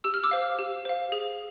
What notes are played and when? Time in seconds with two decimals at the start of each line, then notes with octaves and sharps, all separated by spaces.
0.04 G4 E6
0.14 F6
0.24 D6 E6
0.31 C5 F5
0.59 G4
0.85 C5 F5
1.12 G#4